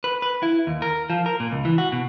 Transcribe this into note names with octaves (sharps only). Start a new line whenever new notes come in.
B4
B4
E4
D#2
A#4
F3
A#4
A#2
C#2
E3
F#4
B2